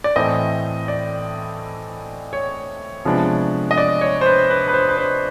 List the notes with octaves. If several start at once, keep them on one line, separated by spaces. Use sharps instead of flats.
D5
A2 E3 A3 C4 D#5
D5
C#5
C3 F3 G#3 B3 D4
D#5
D5
C#5
C5
B4
B4
B4
C5
B4
C5